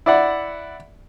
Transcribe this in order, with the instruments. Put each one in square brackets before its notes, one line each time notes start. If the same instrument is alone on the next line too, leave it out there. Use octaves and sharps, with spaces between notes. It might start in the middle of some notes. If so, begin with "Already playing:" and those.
[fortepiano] E4 D5 F#5